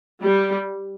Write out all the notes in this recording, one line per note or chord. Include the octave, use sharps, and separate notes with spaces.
G3